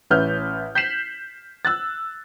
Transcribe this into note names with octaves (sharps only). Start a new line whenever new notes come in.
A1 C#4 B4 E5 F6 G6
G6 B6 C7 E7 F#7
E6 F#6 A6